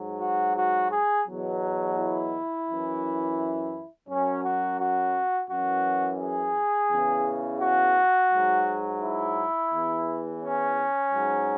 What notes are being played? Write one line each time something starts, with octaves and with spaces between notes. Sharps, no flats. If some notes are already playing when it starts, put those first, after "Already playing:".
Already playing: G#2 F#3
F#4
F#4
G#4
E2 B2 F#3
E4
F#2 E3
F#2 F#3 C#4
F#4
F#4
F#2 E3 F#4
G#4
E2 C#3 E3
F#4
G#2 F#3
E4
E2 E3
C#4
G#2 F#3